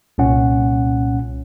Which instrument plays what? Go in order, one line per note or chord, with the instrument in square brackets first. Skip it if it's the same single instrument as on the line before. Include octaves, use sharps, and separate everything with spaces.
[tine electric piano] C2 A#2 C#4 F#5